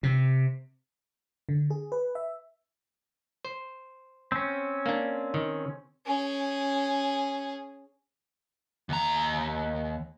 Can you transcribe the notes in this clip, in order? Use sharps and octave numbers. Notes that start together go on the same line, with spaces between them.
C3
D3
G#4
B4
E5
C5
C4 C#4
A#3 D4
D#3
C#4 G#4
D#2 A#5